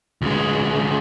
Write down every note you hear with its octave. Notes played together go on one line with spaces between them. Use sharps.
D2 G#3